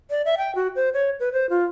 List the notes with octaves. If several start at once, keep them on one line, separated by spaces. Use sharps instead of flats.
D5
E5
G5
F#4
C5
C#5
B4
C5
F4